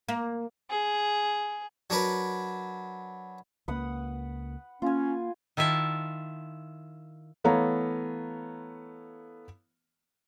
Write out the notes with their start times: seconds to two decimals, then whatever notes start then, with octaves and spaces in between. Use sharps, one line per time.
0.08 A#3
0.70 G#4
1.90 F#3 D4 A#4 B4
3.68 C#2 A#3 B4 F#5 D#6
4.82 A#3 C#4 F4 G#5
5.57 D#3 E4 F4 E5 A5
7.44 E3 A3 B3 C#5 F5 A#5